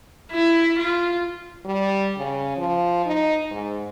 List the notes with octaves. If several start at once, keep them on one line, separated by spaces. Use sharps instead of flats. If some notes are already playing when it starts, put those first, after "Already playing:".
E4
F4
G3
C#3
F3
D#4
G#2